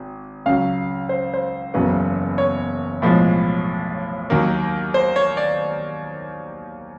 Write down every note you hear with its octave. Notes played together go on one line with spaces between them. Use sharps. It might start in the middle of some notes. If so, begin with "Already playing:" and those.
Already playing: G#1
C#2 C#3 F#3 F5
C5
C5
F#1 E2 C#3 F#3 B3
C#5
B1 A2 F3 G#3
D#2 D#3 F#3 A#3
C5
C#5
D5